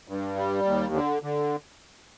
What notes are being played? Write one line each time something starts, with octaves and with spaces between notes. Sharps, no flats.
G2
G3
D#2
D3
D3